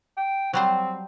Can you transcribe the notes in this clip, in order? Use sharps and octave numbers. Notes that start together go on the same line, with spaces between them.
G5
F#3 G3 C4 C5